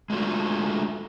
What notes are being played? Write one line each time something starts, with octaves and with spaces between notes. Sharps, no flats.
G#3 A3 D4 F4 F#4